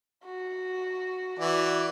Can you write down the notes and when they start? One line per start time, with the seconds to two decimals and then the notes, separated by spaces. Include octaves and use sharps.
0.25 F#4
1.39 E3 F#4 D5